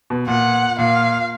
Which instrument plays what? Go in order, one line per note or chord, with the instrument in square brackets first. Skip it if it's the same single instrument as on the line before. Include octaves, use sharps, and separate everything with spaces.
[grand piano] B2
[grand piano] A#2 [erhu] F#5
[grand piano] A#2 [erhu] F5